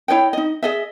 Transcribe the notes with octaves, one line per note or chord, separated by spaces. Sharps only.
E4 C#5 D#5 G5
D#4 D#5
G#4 D#5 E5